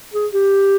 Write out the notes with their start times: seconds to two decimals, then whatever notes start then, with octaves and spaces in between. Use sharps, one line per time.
0.14 G#4
0.33 G4